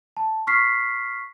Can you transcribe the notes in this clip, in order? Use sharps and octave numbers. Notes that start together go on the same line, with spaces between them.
A5
C#6 F6 B6 C7